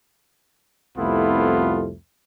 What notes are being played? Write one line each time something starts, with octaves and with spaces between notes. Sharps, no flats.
C2 F2 A3 B3 E4 F4